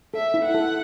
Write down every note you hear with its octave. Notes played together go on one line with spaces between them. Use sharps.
A4 E5
E4
F#5
A4